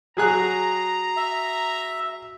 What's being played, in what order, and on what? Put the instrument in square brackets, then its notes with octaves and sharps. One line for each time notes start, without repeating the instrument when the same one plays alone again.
[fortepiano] F#3 G#4 F#6 [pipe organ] A#5
[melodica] E5